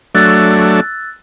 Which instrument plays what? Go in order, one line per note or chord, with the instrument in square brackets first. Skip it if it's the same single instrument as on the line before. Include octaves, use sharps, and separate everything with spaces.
[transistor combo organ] F#3 A3 D4 [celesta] E6 F#6 A6